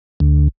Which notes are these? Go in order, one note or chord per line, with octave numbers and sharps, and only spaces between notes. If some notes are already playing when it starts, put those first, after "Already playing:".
D2